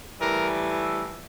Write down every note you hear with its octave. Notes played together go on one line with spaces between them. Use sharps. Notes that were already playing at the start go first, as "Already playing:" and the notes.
A2 E3 G3 A#4